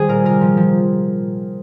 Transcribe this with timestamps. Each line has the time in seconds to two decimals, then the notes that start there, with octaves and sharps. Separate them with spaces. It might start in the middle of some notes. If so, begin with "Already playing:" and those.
Already playing: D#3 G3 G#4 C5
0.08 A#2 A#4
0.25 C3 A#4
0.41 F3
0.57 F3